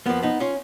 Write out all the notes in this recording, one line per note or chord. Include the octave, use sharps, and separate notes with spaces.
F2 F3 A#3 B3
B3 D#4
C#4 F4